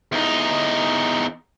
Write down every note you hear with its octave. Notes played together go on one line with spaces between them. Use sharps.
E2 D#4